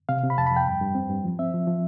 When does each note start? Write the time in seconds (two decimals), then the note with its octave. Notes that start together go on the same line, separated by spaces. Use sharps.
0.09 C3 F5
0.24 C3
0.30 B5
0.37 F2 A5
0.47 B5
0.51 F2
0.56 G5
0.67 G2
0.81 G2
0.95 C4
1.10 G2
1.25 F3
1.39 C4 E5
1.54 F3
1.67 F3